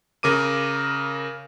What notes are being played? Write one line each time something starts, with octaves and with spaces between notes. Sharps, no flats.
C#3 A#4 D6 D#7